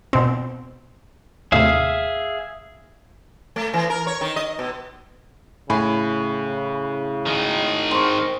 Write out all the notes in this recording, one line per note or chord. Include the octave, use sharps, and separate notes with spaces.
B2 C4
D#2 A2 C3 G#4 E5 F5
A3
E3
A#4
C#5
D#3
D#5
B2
A2 C#3 G#5 B5
D#3 G#4
C4 C6 C#6